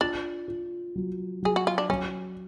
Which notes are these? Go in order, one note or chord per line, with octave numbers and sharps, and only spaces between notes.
D4 F4
F4
F#3
F#3 G#4
F#4
F4
D4
F#3 C#4